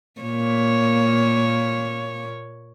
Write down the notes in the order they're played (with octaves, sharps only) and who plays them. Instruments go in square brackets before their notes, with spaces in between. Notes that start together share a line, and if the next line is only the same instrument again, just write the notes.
[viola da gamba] A#2 A#3 C#5